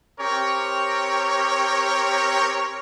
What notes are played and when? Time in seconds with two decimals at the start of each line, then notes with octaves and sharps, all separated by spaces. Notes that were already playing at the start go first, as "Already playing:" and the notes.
0.19 C4 G4 A#4 C#5